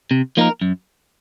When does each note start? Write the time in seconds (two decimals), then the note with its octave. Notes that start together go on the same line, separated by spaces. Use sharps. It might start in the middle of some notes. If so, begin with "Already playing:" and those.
0.11 C3
0.37 F3 A#3 D#4 A#4
0.61 F#2